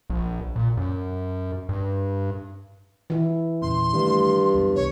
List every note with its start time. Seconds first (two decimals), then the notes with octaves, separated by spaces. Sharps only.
0.10 A#1
0.56 A#2
0.77 F#2
1.69 G2
3.10 E3 E4
3.62 E2 A#2 C#3 C6
3.94 G2 D#3 A3
4.54 C#2 F#2 B3
4.76 C2 B3 C#5